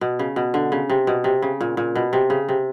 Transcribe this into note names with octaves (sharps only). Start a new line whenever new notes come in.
B2
C#3
B2
D3
C#3
C3
B2
C3
C#3
A#2
A#2
B2
C3
C#3
C3